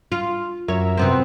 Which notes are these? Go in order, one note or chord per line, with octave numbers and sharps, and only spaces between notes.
F4
F#2 A#4 C#5 E5
C3 B3 C4